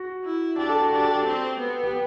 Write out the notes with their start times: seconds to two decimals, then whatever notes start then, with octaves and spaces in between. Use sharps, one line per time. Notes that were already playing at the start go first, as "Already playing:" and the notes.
Already playing: F#4
0.24 E4
0.58 D4 G4
0.69 A4
0.81 F#4
0.92 D4 G4
1.03 A4
1.15 G4
1.27 C4
1.60 B3
1.83 G4